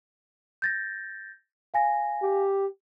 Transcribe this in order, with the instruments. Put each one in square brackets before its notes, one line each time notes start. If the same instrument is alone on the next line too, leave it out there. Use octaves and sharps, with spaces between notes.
[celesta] G6 A6 A#6
F5 G#5 A#6
[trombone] G4